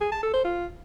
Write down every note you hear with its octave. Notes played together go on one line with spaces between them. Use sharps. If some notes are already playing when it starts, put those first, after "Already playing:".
G#4
A5
A4
C5
F4